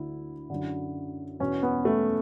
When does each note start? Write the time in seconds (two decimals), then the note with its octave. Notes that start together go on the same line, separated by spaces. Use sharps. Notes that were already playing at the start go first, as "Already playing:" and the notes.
Already playing: D2 D3 E4
0.50 F#2 D3
1.40 E2 B2 C#4
1.63 B3
1.85 A3